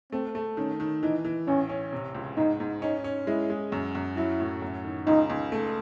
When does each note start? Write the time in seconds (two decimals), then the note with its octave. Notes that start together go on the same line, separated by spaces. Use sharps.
0.12 A3 C4
0.35 A3
0.57 D#3 C#4
0.80 D#3
1.02 E3 D#4
1.25 E3
1.48 A1 C#4
1.69 C#4
1.92 C3
2.14 C#2
2.37 G#2 D#4
2.60 G#2
2.82 C#4 D#4
3.04 C#4
3.27 G#3 E4
3.50 G#3
3.72 F#2
3.95 F#2
4.16 F#3 E4
4.40 A2
4.62 F#2
4.84 D#3
5.07 C#2 D#4
5.30 C#2
5.52 A3